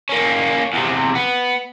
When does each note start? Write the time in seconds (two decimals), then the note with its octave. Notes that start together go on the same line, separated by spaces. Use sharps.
0.09 A#3 C#4
0.73 E2 C3
1.15 B3